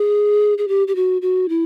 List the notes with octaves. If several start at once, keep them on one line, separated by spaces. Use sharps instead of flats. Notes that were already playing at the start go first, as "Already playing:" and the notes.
Already playing: G#4
G#4
G4
G4
F#4
F#4
E4